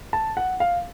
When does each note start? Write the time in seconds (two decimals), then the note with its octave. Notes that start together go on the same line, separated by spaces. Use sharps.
0.13 A5
0.37 F#5
0.60 F5